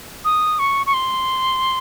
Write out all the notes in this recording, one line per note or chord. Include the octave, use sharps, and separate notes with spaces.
D#6
C#6
C#6
C6